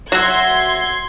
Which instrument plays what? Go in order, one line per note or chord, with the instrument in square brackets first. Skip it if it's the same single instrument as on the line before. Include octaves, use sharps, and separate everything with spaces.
[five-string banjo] F#3 [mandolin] F#4 E5 [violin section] C6 G#6